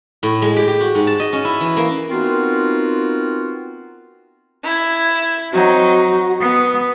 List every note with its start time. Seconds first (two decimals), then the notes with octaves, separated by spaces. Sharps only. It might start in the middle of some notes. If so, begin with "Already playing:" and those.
0.23 A2
0.42 G#3
0.56 G4
0.68 G4
0.80 F#4
0.95 G#2
1.07 A5
1.20 D#5
1.33 C#4
1.45 E4
1.61 E3
1.77 A#3
2.09 B3 C4 D#4 F4 F#4 A#4
4.64 E4 G#6
5.52 F#3 C4 D#4 F#4
6.39 B3 D#6